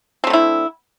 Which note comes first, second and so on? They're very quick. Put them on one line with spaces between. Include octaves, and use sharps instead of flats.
C4 A3 D3 E4